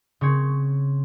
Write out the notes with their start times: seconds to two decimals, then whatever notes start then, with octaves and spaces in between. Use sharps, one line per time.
0.21 C#3 C4 C#5